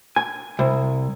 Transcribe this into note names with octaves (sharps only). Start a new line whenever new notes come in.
G#5
C2